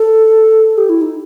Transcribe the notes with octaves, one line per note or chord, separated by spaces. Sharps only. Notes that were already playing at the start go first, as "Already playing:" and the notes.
Already playing: A4
G4
E4
D#4